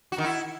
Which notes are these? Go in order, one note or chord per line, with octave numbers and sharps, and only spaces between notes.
F#4
D#3
E4